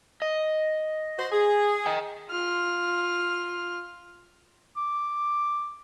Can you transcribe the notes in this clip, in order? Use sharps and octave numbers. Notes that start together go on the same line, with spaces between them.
D#5
F#4 C5
G#4
D#5 G5
F4 F6
D6